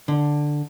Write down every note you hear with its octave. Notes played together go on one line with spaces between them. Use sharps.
D3